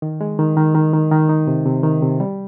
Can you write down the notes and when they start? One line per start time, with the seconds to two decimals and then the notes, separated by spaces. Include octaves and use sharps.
0.02 D#3
0.21 G#3
0.39 D#3
0.57 D#3
0.75 D#3
0.93 D#3
1.12 D#3
1.29 D#4
1.47 C3
1.66 C3
1.83 D#3
2.02 C3
2.20 G3